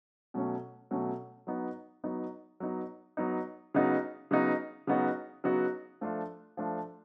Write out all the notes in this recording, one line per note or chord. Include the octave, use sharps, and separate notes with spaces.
B2 F#3 A3 C#4
B2 F#3 A3 C#4
F#3 B3 D#4
F#3 B3 D#4
F#3 B3 D#4
F#3 B3 D#4
C#3 F#3 B3 D#4 F#4
C#3 F#3 B3 D#4 F#4
C#3 F#3 B3 D#4 F#4
C#3 F#3 B3 D#4 F#4
F3 A3 D4 F4
F3 A3 D4 F4